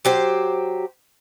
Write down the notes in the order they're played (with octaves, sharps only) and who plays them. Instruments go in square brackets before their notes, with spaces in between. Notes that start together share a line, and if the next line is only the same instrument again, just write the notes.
[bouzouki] F#3 G4 C5